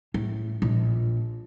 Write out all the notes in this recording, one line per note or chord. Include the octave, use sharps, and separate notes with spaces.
A2
A#1